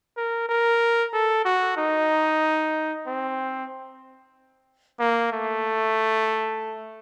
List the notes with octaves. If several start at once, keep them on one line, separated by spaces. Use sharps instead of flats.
A#4
A#4
A4
F#4
D#4
C4
A#3
A3